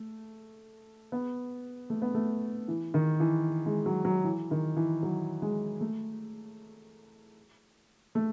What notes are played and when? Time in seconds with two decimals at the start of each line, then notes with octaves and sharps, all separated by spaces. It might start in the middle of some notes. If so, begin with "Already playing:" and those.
Already playing: A3
1.12 B3
1.90 A3
2.02 B3
2.14 A3
2.68 E3
2.94 D#3
3.20 E3
3.66 G#3
3.86 F#3
4.05 F#3
4.24 E3
4.51 D#3
4.76 E3
5.03 F#3
5.42 G#3
5.81 A3
8.15 A3